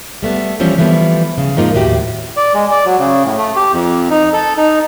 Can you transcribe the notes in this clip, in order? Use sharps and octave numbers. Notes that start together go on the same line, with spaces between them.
G3 A3 B3
E3 F3 G3 C4 C#4
E3 F3 G3 A3 B3
C#3
F2 G#2 F3 A#3 D#4 F4
D#2 A2 F#4 G4
D5
G#3
D5
F#3
C#3
A2
A3
G4
F2
D#4
A4
D#4